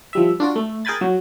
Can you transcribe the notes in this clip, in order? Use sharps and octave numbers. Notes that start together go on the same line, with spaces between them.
F3 G3 E5
D4 F4 F#4 D5
A3
G#4 A#4 G5 G#5 B5 A6
F#3